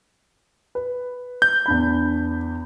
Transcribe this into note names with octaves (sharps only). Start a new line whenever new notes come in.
B4
G6
E2 D4 B5